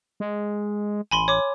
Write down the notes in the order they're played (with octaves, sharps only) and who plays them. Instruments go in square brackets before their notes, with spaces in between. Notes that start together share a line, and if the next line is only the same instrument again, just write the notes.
[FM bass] G#3
[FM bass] A1 [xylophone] G#5 B5 C6
[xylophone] C#5 D6